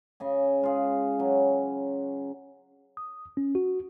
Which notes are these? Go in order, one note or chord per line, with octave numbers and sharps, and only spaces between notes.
C#3 D#5 G#5
G#3 F4 G#4
F#3 C#4
D#6
C#4
F#4